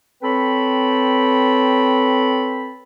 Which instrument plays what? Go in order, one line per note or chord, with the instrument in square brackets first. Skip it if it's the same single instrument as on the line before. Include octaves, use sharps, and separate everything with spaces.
[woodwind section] C4 A4 B4 C#5 G5 B5